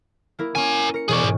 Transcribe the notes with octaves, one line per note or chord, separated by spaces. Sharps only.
A#3 E4 A#4
A#3 C#4 A#4 G#5
A#4 C#7
E1 C#4 G#4 D5 C#6
G#2